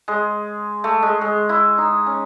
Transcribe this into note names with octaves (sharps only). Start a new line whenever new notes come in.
G#3
A3
G#3
G#3
E4
D#4
C#4